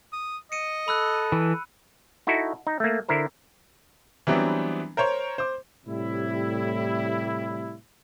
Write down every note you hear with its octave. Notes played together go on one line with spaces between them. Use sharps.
D#6
D#5 C#7 D#7
A4 B5 E6 F#6
E3
D#4 E4 F#4 A4
D#4
A3 A#3
D3 E4 A#4 C5
E3 F#3 G3 B3 C4 D4
A#4 C5 C#5
C5 D6
A2 C3 G3 E4